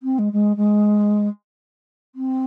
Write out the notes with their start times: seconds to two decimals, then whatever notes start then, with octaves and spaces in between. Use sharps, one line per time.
0.03 C4
0.18 G#3
0.33 G#3
0.56 G#3
2.15 C4